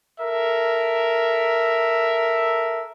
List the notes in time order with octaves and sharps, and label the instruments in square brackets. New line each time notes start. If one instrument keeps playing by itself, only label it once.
[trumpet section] A4 A#4 E5